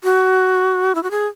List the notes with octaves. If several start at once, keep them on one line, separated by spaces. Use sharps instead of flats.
F#4
E4
F#4
G#4